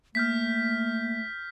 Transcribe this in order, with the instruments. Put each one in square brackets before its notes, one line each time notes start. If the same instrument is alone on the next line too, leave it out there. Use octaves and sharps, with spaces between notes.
[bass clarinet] A3 [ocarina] A#3 [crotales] F6 G6 B6